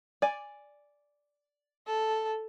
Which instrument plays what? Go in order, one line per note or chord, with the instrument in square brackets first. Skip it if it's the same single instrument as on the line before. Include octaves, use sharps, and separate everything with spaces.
[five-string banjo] D5 G#5
[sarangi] A4